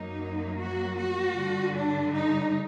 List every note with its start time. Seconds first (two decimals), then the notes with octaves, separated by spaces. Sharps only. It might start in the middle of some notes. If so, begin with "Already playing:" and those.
Already playing: F#2 F#3 A#3 D#4
0.58 F#4
0.97 F#4
1.36 G2 D3 G3
1.75 D4
2.13 D#4